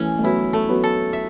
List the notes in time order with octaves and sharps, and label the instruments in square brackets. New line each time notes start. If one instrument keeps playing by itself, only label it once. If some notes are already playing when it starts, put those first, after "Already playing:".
Already playing: [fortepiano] E3 A3 [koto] C#4
[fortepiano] A3
[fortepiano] F#3 B3 [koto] E4
[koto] A3
[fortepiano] F#3 B3
[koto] A4
E5